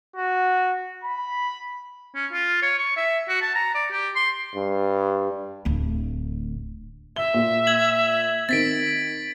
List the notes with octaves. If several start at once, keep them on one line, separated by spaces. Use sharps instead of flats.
F#4
B5
C#4
F4
C#5
C#6
E5
F#4
A5
A#5
D5
G4
C6
G2
D1 D2
E5 G7
A#2
G#6 F#7
D#3 C4 A6 B6 D7